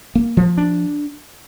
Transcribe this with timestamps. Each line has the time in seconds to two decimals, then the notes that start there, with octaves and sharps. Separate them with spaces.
0.15 A#3
0.37 F3
0.58 D4